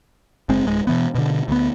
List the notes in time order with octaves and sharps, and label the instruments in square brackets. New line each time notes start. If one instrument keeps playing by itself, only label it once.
[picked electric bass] F#1 G#3 C4
D1 G#3
B2 E3 B3
B2 D3
D2 B3